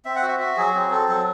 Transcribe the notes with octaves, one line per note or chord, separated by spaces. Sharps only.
C4 E5
F#5
F#4
E5
F#4 E5
F#3 G#4
C4 G#4
C4 A4
F#3 A4